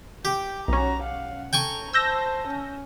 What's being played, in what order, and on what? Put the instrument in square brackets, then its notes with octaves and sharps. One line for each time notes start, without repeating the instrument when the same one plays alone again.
[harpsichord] G4 [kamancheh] G5
[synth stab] B1 C#4 [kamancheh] F#4 A#5
[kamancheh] F5 F#5
[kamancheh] A4 A#5 [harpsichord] G5 G#5 C#6
[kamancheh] C5 A5 [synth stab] E6 G6 A#6
[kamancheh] C#4